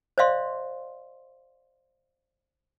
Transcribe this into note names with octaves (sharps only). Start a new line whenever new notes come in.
C5 D5 D#5 F5 C6